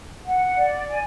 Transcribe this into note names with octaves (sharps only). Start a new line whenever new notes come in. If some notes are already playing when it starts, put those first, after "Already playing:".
F#5
D5
G#5